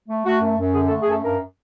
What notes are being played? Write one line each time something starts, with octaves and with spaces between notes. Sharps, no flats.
A3
A3 F#4
F#2
F#2
D3 G#4
A4
A3
G#4
F#2 A4
G2 A#4